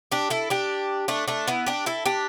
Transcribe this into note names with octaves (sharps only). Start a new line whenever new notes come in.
D4 G4
E4 A4
D4 G4
A3 D4
A3 D4
B3 E4
D4 G4
E4 A4
D4 G4